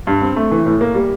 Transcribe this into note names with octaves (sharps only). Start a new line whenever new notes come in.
G2
C4
A3
E3
A2
A#3
G3